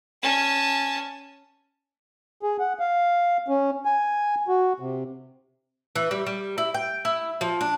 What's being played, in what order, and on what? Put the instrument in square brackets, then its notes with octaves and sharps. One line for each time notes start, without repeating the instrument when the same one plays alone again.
[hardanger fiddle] C#4 A5
[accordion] G#4
F#5
F5
C#4
G#5
F#4
C3
[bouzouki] E3
G3
G3
E4
G5
E4
F3
D4